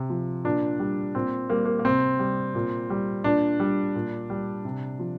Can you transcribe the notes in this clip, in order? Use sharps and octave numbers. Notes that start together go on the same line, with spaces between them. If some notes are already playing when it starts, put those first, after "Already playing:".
Already playing: C3
F3
A#2 D4
G3
A#2 C4
G3 A#3
A#3
A#3
C3 C4
G3
A#2
G3
A#2 D4
G3
A#2
G3
C3
F3